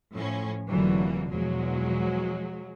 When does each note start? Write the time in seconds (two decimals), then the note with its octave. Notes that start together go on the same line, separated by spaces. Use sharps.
0.15 A2 F3 C#4
0.68 F1 D3 E3 F#3 A#3
1.28 E2 B2 F3 F#3 G#3